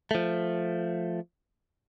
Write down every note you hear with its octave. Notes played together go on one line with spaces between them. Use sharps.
F3 A3